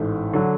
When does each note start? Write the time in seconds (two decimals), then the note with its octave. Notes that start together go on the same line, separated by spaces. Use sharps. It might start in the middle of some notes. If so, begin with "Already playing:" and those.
Already playing: A1 G#2 E3 A3
0.33 D3 F#3